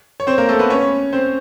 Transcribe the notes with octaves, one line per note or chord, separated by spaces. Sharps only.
C#5
C4 C5
A#3 A#4
A3 A4
B3 B4
C#4 C#5
C4 C5